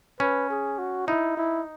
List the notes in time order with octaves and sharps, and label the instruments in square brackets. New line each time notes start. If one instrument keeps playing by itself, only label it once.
[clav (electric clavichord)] C#4 [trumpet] B4
[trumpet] G#4
F#4
[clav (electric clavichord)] D#4 [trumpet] E4
[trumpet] E4